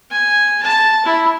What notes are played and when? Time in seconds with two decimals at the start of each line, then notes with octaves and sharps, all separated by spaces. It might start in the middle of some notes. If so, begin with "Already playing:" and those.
0.11 G#5
0.63 A5
1.05 E4